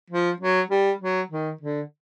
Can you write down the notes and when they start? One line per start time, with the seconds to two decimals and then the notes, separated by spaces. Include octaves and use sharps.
0.10 F3
0.40 F#3
0.71 G3
1.01 F#3
1.30 D#3
1.61 D3